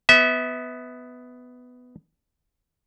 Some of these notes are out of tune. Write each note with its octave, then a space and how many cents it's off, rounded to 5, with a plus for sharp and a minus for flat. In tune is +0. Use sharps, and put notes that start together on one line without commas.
B3 +10 E5 -25